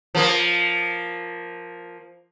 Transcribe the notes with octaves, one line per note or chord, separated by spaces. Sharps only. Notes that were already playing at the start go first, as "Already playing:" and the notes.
F3 A#3